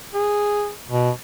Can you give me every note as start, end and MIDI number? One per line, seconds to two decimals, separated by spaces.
0.14 0.70 68
0.89 1.11 47